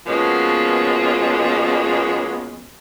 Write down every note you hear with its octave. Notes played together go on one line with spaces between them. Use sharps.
B2 F3 G#3 A#3 B3 C#4